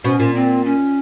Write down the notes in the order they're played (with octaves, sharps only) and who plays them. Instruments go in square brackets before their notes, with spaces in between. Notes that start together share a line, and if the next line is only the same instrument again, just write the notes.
[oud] B2 [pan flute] C#4
[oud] A#2
[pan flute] C4
C#4